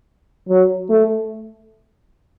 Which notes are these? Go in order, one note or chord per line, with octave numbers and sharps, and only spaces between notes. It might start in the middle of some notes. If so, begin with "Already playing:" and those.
F#3
A3